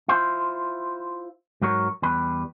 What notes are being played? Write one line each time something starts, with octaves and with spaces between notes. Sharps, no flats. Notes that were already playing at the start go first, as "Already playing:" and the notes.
E4 F4 C5
G#2 F#3 A#4 C#5
E2 G3 B4